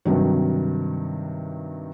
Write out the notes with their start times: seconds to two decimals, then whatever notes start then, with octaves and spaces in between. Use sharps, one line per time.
0.05 G2 C3 D#3 F#3